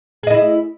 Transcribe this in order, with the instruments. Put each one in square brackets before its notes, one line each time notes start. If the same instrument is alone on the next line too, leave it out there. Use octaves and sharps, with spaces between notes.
[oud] G#4
D#5
E4